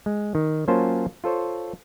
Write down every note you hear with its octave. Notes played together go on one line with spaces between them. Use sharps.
G#3
D#3
F#3 A#3 C#4 F4 C5 A5
F4 A4 C5 C#5